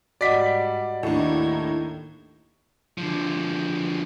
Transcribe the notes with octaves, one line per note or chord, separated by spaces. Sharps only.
G#2 G3 F#4 D5 D#5 F#5 B6
D#2 A2 D4 D#4 G#6
D3 F3